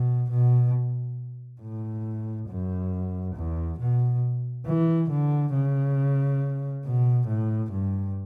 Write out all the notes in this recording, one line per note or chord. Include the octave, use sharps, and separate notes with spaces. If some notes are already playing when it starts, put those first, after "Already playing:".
Already playing: B2
B2
A2
F#2
E2
B2
E3
D3
C#3
B2
A2
G2